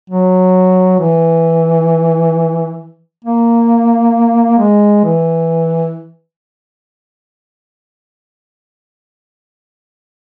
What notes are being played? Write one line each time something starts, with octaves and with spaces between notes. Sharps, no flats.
F#3
E3
A#3
G#3
E3